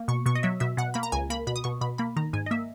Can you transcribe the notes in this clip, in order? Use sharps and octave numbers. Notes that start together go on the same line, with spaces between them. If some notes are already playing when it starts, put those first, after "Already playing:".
Already playing: A#3
B2 C#6
B2 C#6
D#5
F#3 E5
B2 E5
B2 F#5
A#3 B5
A#5
C#2 G#5
A#3 B5
B2 B5
D#6
B2 C#6
B2 B5
A#3 B5
D#3 A#5
G#2 G#5
D#5
A#3 E5